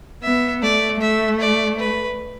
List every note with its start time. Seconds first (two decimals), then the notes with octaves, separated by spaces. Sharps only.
0.23 B3 E5
0.63 A3 D5
1.01 A3 E5
1.41 D5
1.79 B4